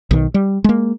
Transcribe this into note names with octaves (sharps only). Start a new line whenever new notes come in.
B1 D#3
G3
G#3 A#3